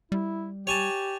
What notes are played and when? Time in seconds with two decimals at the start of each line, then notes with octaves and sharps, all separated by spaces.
0.12 G3 E4
0.67 G4 C#5 G#5 A5